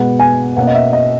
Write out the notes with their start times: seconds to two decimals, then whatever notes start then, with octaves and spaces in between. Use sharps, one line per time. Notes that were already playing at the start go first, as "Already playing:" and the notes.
Already playing: B2 G#3 B3 F#5
0.19 G#5
0.56 B2 A#3 C#4 F#5
0.67 D#5
0.75 E5
0.93 D#5